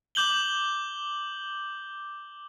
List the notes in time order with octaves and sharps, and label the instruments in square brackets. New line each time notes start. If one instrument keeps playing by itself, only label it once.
[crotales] D6 G6 F#7 G7